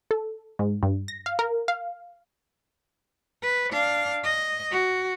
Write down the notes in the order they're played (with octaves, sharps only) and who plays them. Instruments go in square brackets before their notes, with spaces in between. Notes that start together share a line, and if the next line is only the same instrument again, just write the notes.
[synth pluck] A4
G#2
G2
A#6
F5
A#4
F5
[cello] B4
D4 F5
D#5
F#4